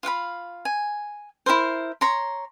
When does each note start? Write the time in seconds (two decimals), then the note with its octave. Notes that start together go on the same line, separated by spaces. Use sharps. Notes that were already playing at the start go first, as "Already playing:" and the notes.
0.03 F4 F5 F#5 B5
0.65 G#5
1.46 E4 G#4 A#4 C5
2.01 C#5 A#5 C6